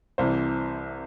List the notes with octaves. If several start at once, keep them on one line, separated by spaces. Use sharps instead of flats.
C2 C3 E3 C5